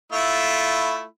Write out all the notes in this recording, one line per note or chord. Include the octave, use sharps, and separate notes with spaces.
A3 E4 F4